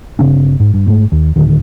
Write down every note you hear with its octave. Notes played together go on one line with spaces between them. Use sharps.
G1 C#3 C4 D4
G#2
G2
G#2 A3
D#2
D1 G1 D2 D#3